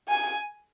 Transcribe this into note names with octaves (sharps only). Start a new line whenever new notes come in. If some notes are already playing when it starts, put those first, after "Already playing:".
G#5